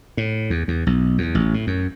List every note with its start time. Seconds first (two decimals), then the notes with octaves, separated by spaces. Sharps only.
0.17 A2
0.50 E2
0.68 E2
0.87 B1
1.18 E2
1.35 A1
1.54 A2
1.67 F#2